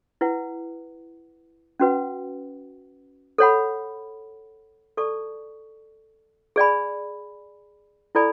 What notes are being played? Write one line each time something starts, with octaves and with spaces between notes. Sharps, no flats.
E4 B4 F#5
C#4 F#4 B4 F#5
A4 C#5 F#5 B5
A4 D5 A5 C#6
G#4 D5 G#5 B5
E4 A4 D5 G#5 B5